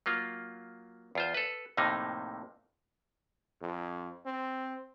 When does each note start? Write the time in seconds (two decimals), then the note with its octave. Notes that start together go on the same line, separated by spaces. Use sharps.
0.06 F#3 A#3 F4
1.15 E2 F4 C5
1.34 A4 B4
1.77 F2 A2 C3 A3 A#3 D#4
3.62 F2
4.26 C4